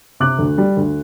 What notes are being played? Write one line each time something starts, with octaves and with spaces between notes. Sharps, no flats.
C3 D6 F#6
D2
G3
D2